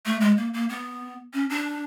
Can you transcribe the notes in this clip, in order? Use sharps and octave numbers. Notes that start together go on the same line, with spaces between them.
A3
G#3
A#3
A#3
B3
C#4
D4